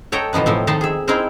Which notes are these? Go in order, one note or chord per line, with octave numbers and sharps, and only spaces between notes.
A4 C#5 D#5 G5 A#5
B2 E3 F3 D#4 B4
A2 F3 C4
D#3 F3 D#4 A5 C6
G#4 E5
C4 D#4 E4 G#4 A#4 C5